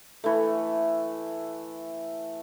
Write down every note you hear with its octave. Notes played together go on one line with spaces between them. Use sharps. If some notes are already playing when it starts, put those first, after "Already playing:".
E3 A3